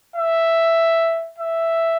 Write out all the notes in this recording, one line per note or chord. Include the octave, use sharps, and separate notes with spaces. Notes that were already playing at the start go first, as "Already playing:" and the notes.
E5
E5